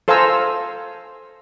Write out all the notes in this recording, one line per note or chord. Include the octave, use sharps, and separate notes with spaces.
A4 C5 F5 G#5 A#5 E6